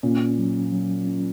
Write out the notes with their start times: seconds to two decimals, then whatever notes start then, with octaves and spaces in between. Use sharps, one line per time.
0.03 A#2 C#4
0.38 F#3
0.72 F#3
1.07 C#4